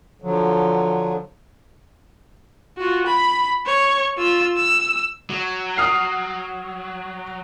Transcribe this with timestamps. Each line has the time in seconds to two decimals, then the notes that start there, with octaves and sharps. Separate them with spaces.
0.22 D3 F3 F#3
2.78 F4 F#4
3.07 B5
3.66 C#5
4.18 F4 E6
4.57 E6
5.30 F#3
5.78 D#6 F6 C7